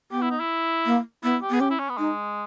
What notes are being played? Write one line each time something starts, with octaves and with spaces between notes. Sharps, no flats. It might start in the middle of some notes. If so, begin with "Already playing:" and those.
B3 G4
E4
D#4
E4
A#3
B3 E4
G4
B3 G#4
C#4 G4
E4
C#4
B3
G#3 D#4